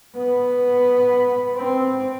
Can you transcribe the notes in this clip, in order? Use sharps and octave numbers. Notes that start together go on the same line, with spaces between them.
B3
C4